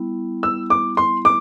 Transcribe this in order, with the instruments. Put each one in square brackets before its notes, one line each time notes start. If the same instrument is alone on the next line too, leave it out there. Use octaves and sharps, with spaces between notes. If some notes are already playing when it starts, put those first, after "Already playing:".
Already playing: [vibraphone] G3 B3 E4
[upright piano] E6
D6
C6
D6